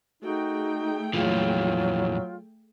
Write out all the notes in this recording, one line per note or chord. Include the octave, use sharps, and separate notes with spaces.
A3 D#4 F#4 G#4 G5
F2 A#2 E3 F#3 F4